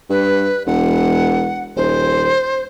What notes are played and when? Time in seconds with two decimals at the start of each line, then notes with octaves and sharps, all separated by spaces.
0.10 G2 B4
0.67 E1 F#5
1.76 D#1 C5